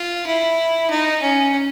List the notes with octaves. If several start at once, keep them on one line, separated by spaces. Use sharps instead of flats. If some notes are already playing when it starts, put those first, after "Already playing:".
Already playing: F4
E4
D#4
C#4